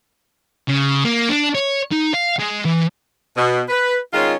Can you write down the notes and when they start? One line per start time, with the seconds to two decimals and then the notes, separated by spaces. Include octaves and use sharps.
0.68 C#3
1.04 A#3
1.29 D4
1.55 C#5
1.92 D#4
2.14 F5
2.39 G#3
2.65 E3
3.37 B2
3.68 B4
4.13 D#3 G#3 C#4 F4